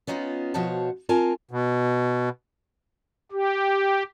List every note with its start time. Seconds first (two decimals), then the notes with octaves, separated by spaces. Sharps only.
0.07 B3 C#4 D#4 F4
0.54 B2 F3 F#4 C5 C#5 A5
1.09 C4 F4 A#4 G#5 A5
1.51 B2
3.32 G4